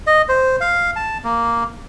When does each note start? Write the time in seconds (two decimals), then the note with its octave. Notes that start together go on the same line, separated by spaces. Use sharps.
0.07 D#5
0.29 C5
0.61 F5
0.96 A5
1.24 A#3